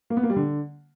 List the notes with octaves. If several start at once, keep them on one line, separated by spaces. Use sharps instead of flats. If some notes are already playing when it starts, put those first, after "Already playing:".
A#3
B3
A#3
G3
D3